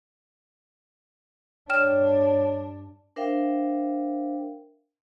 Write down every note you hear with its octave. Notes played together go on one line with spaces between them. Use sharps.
G2 D4 C#5 G5 F6 E7
D4 A#4 C5 E5 F5 G5